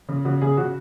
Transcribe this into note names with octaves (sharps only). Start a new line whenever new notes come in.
C#3
C#3 F#4
C#3 G#4
C#3 F#4